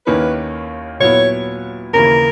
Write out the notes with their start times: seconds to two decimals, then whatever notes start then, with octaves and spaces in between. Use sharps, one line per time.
0.06 D#2 D#3 A#3 C#4 E4 B4
1.00 A#2 F#3 B3 E4 C#5
1.93 D#2 C#3 E3 A#3 E4 A#4